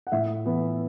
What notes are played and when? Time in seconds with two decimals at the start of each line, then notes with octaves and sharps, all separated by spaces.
0.07 F#5
0.12 A2 E5
0.45 E3 B3